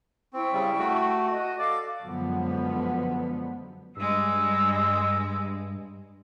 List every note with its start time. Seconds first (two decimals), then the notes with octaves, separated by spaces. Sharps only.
0.33 C4 E4 G5 C#6
0.53 C#3 G3
0.79 A3 F#4
1.30 F#4 D#5
1.59 A4 D5 F5 D6
2.04 F#2 D3 F3 F#3 G#3 B3
3.96 G2 G3 G#3 E6